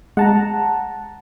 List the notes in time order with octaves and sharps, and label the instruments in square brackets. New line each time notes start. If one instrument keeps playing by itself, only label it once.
[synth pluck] G#3 [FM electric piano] F#5 A5 A#5